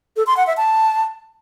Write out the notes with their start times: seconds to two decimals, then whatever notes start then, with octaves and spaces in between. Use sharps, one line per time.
0.17 A4
0.27 C6
0.37 F#5
0.47 E5
0.57 A5